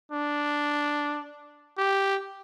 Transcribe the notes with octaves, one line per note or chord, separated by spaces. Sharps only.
D4
G4